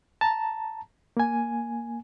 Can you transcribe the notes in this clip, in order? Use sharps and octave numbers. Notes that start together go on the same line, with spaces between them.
A5 A#5
A#3 G#5